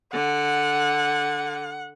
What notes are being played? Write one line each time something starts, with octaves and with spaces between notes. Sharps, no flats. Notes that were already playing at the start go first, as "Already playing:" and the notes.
D3 F#5